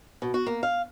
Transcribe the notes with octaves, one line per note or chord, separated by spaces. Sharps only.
B2
F#4
A#3
F5